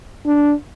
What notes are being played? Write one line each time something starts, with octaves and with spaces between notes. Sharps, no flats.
D4